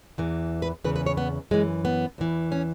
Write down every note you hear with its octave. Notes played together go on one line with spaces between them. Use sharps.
E2 E3
B4
E2 C#3 E3 B4
B4
C#5
B3
F#2 E3 G#3
B3
E2 E3
C#4